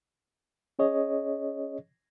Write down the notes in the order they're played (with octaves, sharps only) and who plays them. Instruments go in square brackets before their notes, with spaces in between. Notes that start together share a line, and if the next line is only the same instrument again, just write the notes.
[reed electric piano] C#4 G#4 C#5 D#5